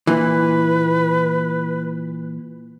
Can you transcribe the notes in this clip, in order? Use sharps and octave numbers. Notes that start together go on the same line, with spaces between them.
A#2 E3 B4